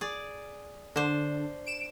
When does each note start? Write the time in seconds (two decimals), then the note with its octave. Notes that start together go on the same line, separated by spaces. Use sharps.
0.01 G#4 D5
0.96 D3 D4 C5
1.66 D7 E7